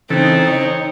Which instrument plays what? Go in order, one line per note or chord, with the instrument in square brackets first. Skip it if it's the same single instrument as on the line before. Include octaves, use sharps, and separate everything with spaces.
[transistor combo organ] C#3 E3 A4 [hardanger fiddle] C4 [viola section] D#4
[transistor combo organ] C#5